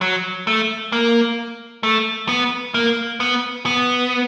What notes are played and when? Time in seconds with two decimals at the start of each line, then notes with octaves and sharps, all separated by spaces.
0.01 F#3
0.47 A3
0.92 A#3
1.83 A3
2.29 B3
2.74 A#3
3.20 B3
3.66 B3